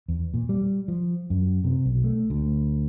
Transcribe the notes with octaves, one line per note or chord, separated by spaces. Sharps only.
E2
A#2
G3
F3
F#2
C3
B1
A3
D2